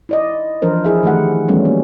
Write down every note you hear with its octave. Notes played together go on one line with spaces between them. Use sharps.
E4 D5 D#5
E3 F3 D4 A#4 C5
E4 G#4 E5
D#3 E3 A3 G4 F#5
E3 F#3 G3 A3 B3 C#4
A#3